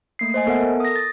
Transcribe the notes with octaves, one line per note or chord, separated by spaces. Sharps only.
A3 A#3 C7
C5 D#5 G#5
B3 A4 A#4 E5 F#5
A4 A#4
D#6 A#6
A6